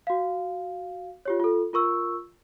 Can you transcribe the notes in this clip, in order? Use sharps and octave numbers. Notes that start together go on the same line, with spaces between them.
F#4 F5
F4 G4 C#5
F4 A4
F4 A#4 C#6 E6